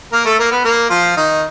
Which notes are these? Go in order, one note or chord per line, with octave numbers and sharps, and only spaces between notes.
A#3 A#4
A3 A4
A#3 A#4
B3 B4
A#3 A#4
F3 F4
D#3 D#4